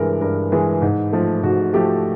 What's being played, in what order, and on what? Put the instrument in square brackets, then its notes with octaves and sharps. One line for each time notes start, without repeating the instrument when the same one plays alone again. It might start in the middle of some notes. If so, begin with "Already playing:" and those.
Already playing: [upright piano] G2 E3 G#3 A#4
G2 A#4
E3 G#3 G#4
G#2
F3 A3
G#2 F#4
F3 A3 G4